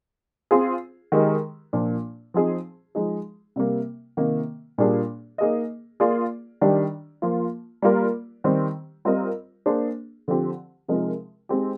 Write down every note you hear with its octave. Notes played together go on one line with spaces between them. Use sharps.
C4 F4 G#4
D#3 G#3 D#4 G4 A#4
A#2 F3 A#3 D4
F3 C4 D#4 G#4
F3 G#3 D#4 G#4
C3 G3 A#3
C3 D#3 A#3
A#2 G3 A#3 D4 G#4
A#3 D#4 G#4 D#5
A#3 F4 G#4 D5
D#3 G3 D4 G4 D5
F3 A#3 F4
G3 A#3 F4 A#4 D5
D#3 G3 C4 G4 C5
G3 C4 F4 A#4 D#5
A#3 D4 G#4 C5
D3 F3 C4 G4
C3 F3 G#3 D#4 A#4
G#3 C4 D#4 G4